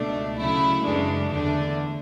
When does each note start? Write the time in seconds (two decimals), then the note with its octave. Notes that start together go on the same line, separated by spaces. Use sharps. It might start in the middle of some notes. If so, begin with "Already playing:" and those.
Already playing: C#2 B2 A3 D4
0.38 D2 C#3 F#3 A3 E4
0.85 F#2 C#3 E3 G#3 D4
1.31 E2 D3 A3 D4